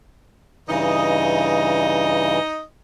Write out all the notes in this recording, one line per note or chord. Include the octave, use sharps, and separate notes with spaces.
G2 C#3 E3 D#4 D#5